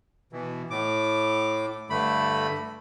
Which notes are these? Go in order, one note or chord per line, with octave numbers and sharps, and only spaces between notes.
B2 E3
A2 D6
G2 D3 A3 B5